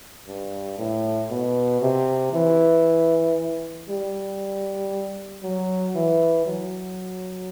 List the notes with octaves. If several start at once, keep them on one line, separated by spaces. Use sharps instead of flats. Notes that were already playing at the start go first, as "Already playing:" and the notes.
G2
A2
B2
C3
E3
G3
F#3
E3
F#3